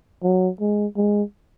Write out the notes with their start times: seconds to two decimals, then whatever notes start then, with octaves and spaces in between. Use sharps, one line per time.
0.23 F#3
0.61 G#3
0.97 G#3